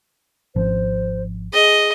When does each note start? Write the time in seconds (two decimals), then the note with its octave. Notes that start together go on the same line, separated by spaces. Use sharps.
0.56 G#1 F3 C5
1.53 G#4 D#5